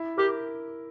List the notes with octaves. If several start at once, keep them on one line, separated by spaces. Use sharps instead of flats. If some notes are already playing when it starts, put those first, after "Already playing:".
Already playing: E4
G4 A#4